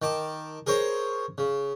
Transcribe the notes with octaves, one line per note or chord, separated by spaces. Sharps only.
D#3 A5 D6
G#4 A#4 C5 C#5
C#3